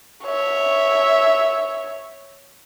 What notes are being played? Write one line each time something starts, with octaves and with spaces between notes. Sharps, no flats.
C#5 E5